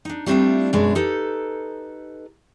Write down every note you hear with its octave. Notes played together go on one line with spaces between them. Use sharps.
D4 D#4
G3 A3 C4 D4 E4 F4
F#2 B2 G#3 B3 D4
D#4 G4 A4 B4